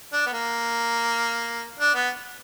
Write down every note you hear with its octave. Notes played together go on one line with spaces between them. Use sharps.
D4
B3
A#3
D4
B3